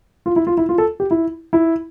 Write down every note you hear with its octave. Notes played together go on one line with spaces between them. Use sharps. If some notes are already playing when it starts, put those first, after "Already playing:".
F4
E4
F4
E4
F4
A4
G4
E4
E4